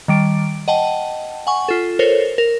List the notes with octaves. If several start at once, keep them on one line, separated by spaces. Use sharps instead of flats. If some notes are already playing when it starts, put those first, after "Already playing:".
D#3 G3 D7
D#5 F#5 G5 A5
F#5 G#5 C#6
F4 A4
A4 A#4 C5 C#5
A#4